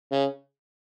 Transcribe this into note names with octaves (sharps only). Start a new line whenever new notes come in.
C#3